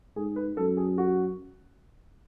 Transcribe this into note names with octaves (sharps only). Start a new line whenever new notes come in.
G#2 G#4
B4
F#2 A4
G#4
F#4